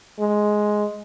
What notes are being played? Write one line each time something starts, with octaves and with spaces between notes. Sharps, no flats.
G#3